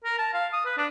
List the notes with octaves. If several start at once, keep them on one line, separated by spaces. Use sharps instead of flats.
A#4
A5
F5
D#6
B4
D4